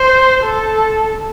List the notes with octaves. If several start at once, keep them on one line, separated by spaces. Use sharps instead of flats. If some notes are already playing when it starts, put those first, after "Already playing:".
Already playing: C5
A4